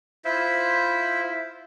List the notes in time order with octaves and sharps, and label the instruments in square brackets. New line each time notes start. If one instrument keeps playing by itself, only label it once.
[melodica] E4 F4 C5 E5